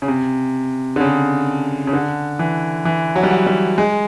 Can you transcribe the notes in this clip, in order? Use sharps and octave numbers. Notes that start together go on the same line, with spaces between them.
C#3
C3
D3
C#3
C#3
D3
E3
E3
F#3
G3
F#3
G3
G#3